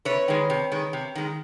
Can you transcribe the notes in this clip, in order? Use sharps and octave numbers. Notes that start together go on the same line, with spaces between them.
C3 B4 C#5
D#3 G#3
C3
D#3 G#3
C3
D#3 G#3